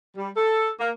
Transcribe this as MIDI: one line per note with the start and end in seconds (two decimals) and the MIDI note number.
0.17 0.29 55
0.36 0.69 69
0.79 0.90 58